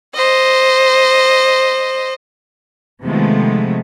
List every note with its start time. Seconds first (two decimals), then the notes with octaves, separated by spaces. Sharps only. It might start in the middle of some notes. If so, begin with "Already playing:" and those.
0.15 C5 D#5
3.03 C3 D#3 F3 G#3 A3 B3